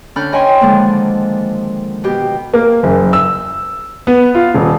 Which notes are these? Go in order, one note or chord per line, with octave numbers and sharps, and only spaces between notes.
D3 C#4 D4 B5 F6 G6
C#5 D#5 G5 G#5 B5 C6
D3 D#3 F3 G#3 A#3
B2 G4
A#3
F#1
E6
B3
F4
D#1